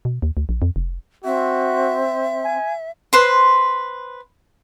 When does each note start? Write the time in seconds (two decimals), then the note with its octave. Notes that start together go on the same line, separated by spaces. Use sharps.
0.05 B2
0.22 D#2
0.37 D2
0.49 A#1
0.62 F2
0.76 F1
1.25 C4 F#4 E5
2.45 G#5
3.13 B4 C5 C6